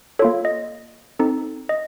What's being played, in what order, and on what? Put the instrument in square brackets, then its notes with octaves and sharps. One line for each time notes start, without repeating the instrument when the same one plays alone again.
[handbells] A4 C#5
A#3 F4
D#5
C4 D#4 A4
D#5